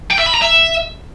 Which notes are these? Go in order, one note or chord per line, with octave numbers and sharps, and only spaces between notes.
G5
E5
B5
A#5
E5